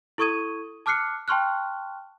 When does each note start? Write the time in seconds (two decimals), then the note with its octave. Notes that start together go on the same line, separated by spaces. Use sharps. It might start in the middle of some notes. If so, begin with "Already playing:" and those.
0.18 E4 A4 C#6 D#6 G#6 D#7
0.86 A5 D6 F6 F#6 C7 C#7
1.28 G5 A5 C6 C#6 F6 F#6